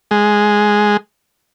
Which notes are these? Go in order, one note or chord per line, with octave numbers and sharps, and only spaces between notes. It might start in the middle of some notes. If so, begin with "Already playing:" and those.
G#3